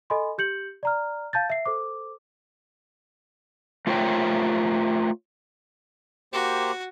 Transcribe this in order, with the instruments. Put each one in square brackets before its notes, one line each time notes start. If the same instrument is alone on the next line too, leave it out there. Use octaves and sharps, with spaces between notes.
[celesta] A4 D#5 G#5 B5 C6
G4 G6 C#7 F#7
D5 A#5 F6
F5 A5 G6 A6
E5 C7
A4 C5 D6
[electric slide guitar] A3 F4 A#4 C5 C#5 G5
[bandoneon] A#3 G4 C5 [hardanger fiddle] F#4